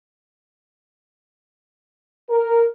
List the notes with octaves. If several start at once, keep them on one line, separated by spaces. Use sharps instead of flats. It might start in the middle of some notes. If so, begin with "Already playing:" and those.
A#4